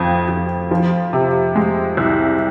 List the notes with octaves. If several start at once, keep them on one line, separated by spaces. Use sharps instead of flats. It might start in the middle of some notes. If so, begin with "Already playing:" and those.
Already playing: F2 F3
F2
F3
C3
G#3
C2